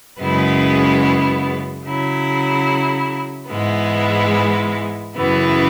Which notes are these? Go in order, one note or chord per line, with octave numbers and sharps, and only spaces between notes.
F#2 C#3 G#3 B3 E4
C#3 F#3 E4
G#2 E3 G#3 B3 E4
F#2 C#3 E3 B3 E4